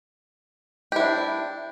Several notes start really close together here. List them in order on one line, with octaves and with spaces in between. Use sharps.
G4 E4 D4